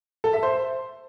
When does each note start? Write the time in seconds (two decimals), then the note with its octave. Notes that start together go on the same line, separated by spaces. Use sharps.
0.24 A4
0.33 E5
0.43 C5